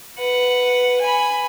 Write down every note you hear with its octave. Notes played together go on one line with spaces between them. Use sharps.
B4 F#5
G#5 B5